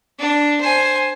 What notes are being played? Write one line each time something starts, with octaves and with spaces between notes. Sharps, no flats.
D4
C5 G#5